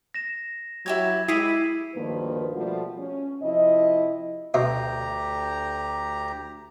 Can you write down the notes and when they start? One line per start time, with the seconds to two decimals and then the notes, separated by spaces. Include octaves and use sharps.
0.14 A#6 E7
0.86 F#3 E4 G4 C#5 G#6
1.28 G#3 E4 G4 D#6 B6 C7 D#7
1.95 D2 G2 D#3 F3 A#3 B4
2.55 B2 F3 G3 A3 F4 F#4
2.99 C#4
3.42 C3 F3 E4 D#5
4.54 D2 B2 G4 E5 A#5